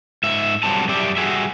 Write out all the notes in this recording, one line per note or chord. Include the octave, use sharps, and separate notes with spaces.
G#2 E5
F2 F#3 G3 C4 D4 A5
F#2 G3 G4 D5 E5
G3 F#4 G#4 E5